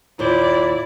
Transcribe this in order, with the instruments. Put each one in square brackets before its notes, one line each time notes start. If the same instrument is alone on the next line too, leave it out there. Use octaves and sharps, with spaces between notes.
[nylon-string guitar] D#2 A#2 C5 [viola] E4 D5